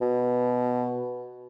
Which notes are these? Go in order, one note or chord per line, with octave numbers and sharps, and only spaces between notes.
B2